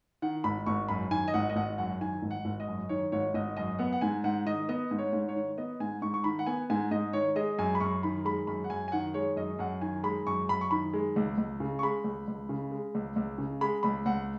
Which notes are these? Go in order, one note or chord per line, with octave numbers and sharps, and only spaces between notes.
D#3 F#5
G#1 B5
G#1 C#6
F#2 B5
D#3 G#5
D#5
G#1 F#5
D#5
G#1 F#5
F#2 F#5
D#3 G#5
G#1
F#5
G#1
D#5
F#2
D#3 C#5
G#1 C#5
G#1 D#5
F#2 D#5
B3 F#5
F#5
G#2 G#5
G#2 F#5
D#3 D#5
B3 D#5
G#2
C#5
G#2
C#5
D#3
B3 D#5
G#2 G#5
G#2 C#6
C#6
D#3 B5
F#5
B3 G#5
G#2 G#5
G#2 D#5
D#3 C#5
G#3 D#5
F#2 G#5
B5
F#2 C#6
D#3 B5
G#3 B5
F#2 B5
F#5
F#2 G#5
G#5
D#3 F#5
G#3 C#5
F#2 D#5
F#2 F#5
D#3 G#5
G#3 B5
F#2 C#6
F#2 B5
C#6
D#3 B5
G#3
C#2
C#2
C#3
C#6
G#3 B5
C#2
C#2
C#3
G#3
C#2
C#2
C#3
G#3 B5
C#2 B5
C#2 F#5